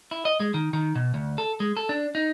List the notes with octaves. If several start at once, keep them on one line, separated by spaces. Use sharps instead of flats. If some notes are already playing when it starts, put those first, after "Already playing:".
E4
D#5
G#3
D#3
D#3
B2
D2
A4
G#3
A4
D4
D#4